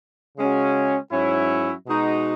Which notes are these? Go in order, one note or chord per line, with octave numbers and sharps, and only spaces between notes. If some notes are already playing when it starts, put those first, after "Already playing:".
C#3 G#3 C#4 F#4
G#2 F#3 C#4 E4
B2 G#3 D#4 F#4